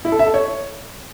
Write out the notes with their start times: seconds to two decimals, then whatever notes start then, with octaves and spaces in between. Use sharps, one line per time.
0.05 E4
0.12 A4
0.19 E5
0.27 A4
0.34 C#5